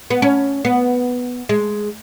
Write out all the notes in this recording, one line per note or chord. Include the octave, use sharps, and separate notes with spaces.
B3
C#4
B3
G#3